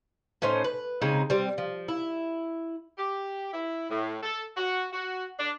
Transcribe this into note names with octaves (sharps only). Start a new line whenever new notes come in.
A2 C#4 D#4 C5
B4
C#3 G#3 C4 D#4
G3 C4
F3
E4
G4
E4
A2
A4
F#4
F#4
D4